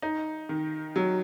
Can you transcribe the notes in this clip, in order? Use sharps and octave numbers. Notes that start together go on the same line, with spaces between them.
D#4
D#3
F#3